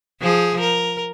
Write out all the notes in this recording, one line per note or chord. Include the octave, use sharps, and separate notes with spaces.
F3 G#4
A#4